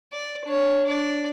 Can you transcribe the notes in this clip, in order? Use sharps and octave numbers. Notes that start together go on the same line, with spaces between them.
D5
D4 C#5
D4 D5